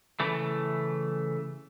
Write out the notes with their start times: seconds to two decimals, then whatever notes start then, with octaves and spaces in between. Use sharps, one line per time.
0.20 C#3 E3 A3